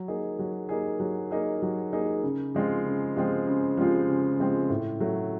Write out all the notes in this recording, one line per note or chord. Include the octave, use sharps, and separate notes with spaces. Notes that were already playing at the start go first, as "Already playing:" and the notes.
Already playing: F#3
A#3 D#4 G#4
F#3
A#3 D#4 G#4
F#3
A#3 D#4 G#4
F#3
A#3 D#4 G#4
C#3
F3 G#3 C4 F4
C#3
F3 G#3 C4 F4
C#3
F3 G#3 C4 F4
C#3
F3 G#3 C4 F4
A2
F#3 A3